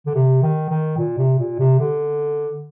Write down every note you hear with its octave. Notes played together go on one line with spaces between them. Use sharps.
D3
C3
D#3
D#3
A#2
C3
A#2
C3
D3